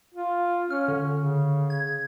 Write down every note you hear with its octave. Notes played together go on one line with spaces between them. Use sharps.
F4
C#4 F6
D3
C#3
G#6